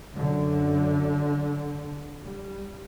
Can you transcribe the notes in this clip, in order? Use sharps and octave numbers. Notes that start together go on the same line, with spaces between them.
F#2 D3
G3